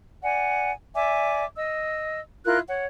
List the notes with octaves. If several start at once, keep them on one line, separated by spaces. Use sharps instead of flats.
D5 F#5 G#5
D5 E5 G#5 D6
D#5 E6
E4 F4 A#4 F#6
C#5 F#5